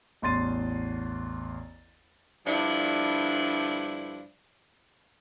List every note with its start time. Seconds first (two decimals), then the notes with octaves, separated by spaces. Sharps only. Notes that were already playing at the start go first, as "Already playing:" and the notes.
0.22 A1 E2 C6 A6 D#7
2.46 G2 D3 F3 D4 E4